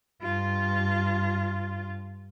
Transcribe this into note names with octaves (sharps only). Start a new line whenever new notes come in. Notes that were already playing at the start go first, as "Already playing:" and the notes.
G2 F4